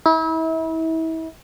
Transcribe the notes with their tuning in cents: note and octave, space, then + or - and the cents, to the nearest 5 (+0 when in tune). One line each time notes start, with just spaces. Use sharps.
E4 -35